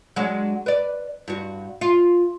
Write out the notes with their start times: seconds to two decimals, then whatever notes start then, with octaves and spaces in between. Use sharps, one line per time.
0.16 F#3 G#3 D4
0.66 B4 D5
1.28 G2 F#4
1.81 F4